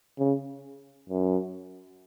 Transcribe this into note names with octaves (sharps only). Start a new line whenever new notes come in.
C#3
F#2